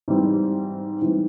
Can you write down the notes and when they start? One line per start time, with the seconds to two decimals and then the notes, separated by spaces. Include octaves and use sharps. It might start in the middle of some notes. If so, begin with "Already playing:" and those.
0.08 G#2 E3 G3 C4
1.01 G#2 E3 G3 C4